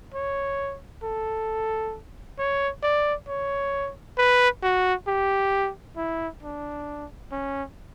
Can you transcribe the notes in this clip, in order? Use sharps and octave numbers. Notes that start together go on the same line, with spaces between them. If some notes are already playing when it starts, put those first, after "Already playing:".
C#5
A4
C#5
D5
C#5
B4
F#4
G4
E4
D4
C#4